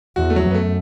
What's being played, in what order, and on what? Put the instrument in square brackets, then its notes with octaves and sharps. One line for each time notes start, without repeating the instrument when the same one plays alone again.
[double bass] E2 [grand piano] F#4
[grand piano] A3
F#3
[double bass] F#2
[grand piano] B3
A3